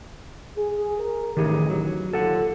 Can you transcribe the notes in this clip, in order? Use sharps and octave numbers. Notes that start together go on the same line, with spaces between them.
G#4
A#4
A1 D#3 D#4 G4 G#4
F#3
D#2 A#2 F4 A4 F#5